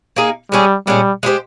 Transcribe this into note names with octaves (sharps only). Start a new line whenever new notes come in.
A#3 D#4 G#4
G3 G#3 C#4 G#4
A#2 G3 G#3 C#4
G#3 D#4 G4 C5